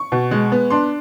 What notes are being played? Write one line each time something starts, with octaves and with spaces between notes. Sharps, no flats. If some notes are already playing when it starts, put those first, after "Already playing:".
Already playing: C#6
B2
G#3
B3
D4 C6